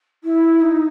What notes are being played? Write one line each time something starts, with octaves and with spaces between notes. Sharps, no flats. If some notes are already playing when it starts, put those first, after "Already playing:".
E4
D#4